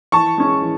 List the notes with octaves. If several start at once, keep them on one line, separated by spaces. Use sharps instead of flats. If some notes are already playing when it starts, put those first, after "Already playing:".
E3 A5 C#6
G#3 C#4
E3